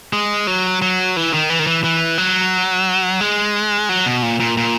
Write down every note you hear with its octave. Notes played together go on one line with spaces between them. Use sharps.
G#3
F#3
F#3
E3
D#3
E3
D#3
E3
E3
F#3
G#3
F#3
B2
A#2
A#2
A#2